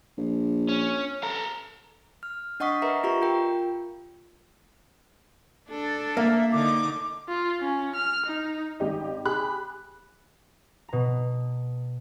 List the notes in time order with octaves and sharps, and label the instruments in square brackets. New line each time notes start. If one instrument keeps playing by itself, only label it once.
[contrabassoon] A#1
[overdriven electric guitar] C#4
A4 A#5
[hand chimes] F6
D4 D#5 F#5 C#6 D#6 B6
A#4 B4 D#5 E5 A#5
F4 G4 A#5 C#6
F4 A#4 G5
[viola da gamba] D4 A4
[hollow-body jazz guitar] A#3 [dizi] E5
[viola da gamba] D3 D#4 [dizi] D6
[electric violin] F4
C#4
F6
D#4
[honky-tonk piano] G#1 G4 D#5
G4 G#4 B5 F#6
[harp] B2 A#5